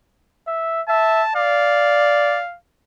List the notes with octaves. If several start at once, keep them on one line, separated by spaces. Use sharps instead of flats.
E5
E5 A5
D5 F5